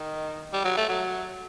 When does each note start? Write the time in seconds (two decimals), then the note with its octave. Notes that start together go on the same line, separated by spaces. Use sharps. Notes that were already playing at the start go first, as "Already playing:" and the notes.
Already playing: D#3
0.53 G3
0.64 F#3
0.77 A3
0.89 F#3